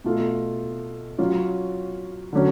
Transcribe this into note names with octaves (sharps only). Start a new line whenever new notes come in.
B2 A3 F4
F#3 C#4 F4
D3 F#3 C#4